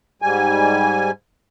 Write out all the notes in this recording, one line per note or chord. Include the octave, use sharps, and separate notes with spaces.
G#2 G3 G#5